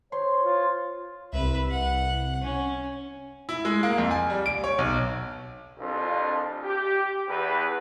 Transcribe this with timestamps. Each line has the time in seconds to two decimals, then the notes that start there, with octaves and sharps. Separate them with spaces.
0.12 C5 C#5 C6
0.44 F4
1.33 C2 B4 E5
1.70 F#5
2.41 C#4
3.49 E4
3.65 G#3
3.83 A#3
3.98 F2
4.11 G#5
4.30 G3
4.46 D7
4.64 C#5
4.78 B1
5.78 C2 F2 D4 F4
6.63 G4
7.27 E2 B4